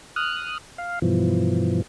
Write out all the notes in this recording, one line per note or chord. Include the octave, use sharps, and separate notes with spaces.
D#6 F6 F#6
F5
G2 B2 E3 F3